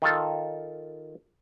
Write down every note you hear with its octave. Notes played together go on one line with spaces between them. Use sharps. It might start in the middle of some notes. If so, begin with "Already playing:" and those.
D#3 F4 A4